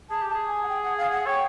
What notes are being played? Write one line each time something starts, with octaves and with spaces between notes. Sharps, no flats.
G#4 A5
G4
G#4 A5
G#5
F#5
G5
F#5
F5
F#5
C#5 G5